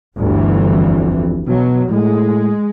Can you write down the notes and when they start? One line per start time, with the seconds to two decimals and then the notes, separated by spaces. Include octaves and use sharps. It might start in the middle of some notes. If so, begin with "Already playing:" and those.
0.17 G1 D2 E3
0.69 F2
1.47 B2 F#3
1.90 A2 G#3